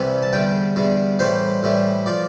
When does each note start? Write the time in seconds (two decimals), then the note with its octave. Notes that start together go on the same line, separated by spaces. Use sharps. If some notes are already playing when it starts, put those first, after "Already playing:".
Already playing: C2 C3 E3 G3
0.23 A5
0.33 E2 D3 G3 G5
0.76 E2 D3 G3
1.19 A2 E3 G3 C5
1.63 A2 E3 G3
2.06 F3 D5